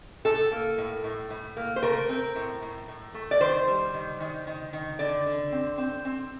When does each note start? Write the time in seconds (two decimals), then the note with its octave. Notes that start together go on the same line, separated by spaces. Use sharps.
0.25 A2 A4
0.52 A#3
0.78 A2
1.04 A2
1.30 A2
1.57 A#3
1.76 C5
1.83 A3 A#4
2.09 C4
2.35 A2
2.62 A2
2.88 A2
3.14 A3
3.31 D5
3.40 D#3 C5
3.67 G3
3.94 D#3
4.20 D#3
4.47 D#3
4.73 D#3
4.99 D3 D5
5.26 D3
5.52 C4
5.78 C4
6.05 C4